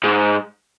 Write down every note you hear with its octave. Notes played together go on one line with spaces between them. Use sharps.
G#2